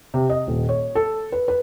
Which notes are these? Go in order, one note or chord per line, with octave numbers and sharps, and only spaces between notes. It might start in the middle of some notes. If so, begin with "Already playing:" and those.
C3
D#5
D#1
C#5
A4
B4
B4